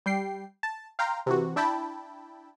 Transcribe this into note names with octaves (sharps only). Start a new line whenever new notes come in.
G3 G5 C7
A5
F5 G5 A#5 C6
C3 E3 F#4
D4 E4 G5 A5 B5